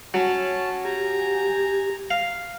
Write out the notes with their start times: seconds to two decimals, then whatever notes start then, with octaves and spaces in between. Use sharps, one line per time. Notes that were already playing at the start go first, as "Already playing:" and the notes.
0.14 F#3 C#4 A5
0.85 G4 G#5 A#5
2.11 F5